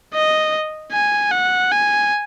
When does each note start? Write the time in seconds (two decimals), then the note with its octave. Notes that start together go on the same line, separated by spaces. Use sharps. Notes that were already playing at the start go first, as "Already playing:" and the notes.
0.14 D#5
0.92 G#5
1.32 F#5
1.71 G#5